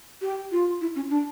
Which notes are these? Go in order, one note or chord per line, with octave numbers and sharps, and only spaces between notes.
G4
F4
E4
C#4
D4